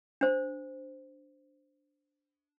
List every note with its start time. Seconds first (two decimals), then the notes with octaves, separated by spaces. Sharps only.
0.21 D4 C5